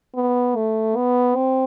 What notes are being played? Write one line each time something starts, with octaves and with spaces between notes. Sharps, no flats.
B3
A3
B3
C4